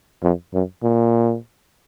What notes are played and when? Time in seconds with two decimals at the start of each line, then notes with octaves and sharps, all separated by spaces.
0.23 F2
0.54 F#2
0.83 A#2